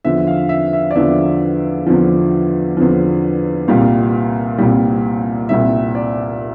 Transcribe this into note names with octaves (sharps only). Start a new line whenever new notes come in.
E2 D3 F3 E5
F5
E5
E5
D5
E2 D3 F3 E5
E2 D3 F3
E2 D3 F3
C2 A#2 G3 F5
C2 A#2 G3
C2 A#2 G3 E5
D5